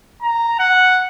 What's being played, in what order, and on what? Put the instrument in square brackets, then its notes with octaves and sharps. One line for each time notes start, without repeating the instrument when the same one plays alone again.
[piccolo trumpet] A#5
F#5